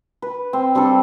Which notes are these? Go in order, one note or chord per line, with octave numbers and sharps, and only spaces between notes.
B4
C4
G3 C4 D4 A4